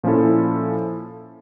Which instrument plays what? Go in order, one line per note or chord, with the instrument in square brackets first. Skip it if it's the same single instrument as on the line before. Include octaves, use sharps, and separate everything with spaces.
[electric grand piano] A#2 F3 C#4 E4 A4